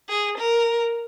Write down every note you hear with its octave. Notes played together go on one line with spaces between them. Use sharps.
G#4
A#4